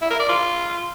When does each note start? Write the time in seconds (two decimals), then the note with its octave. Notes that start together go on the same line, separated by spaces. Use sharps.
0.02 E4
0.11 A#4
0.20 D5
0.29 F4